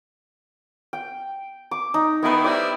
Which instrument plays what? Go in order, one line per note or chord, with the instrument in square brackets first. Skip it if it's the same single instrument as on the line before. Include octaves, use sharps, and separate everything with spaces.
[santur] G5
D6
D#4
[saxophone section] D#3 A3 E4 [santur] B3 B4
[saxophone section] G3 C4 E4 [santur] D5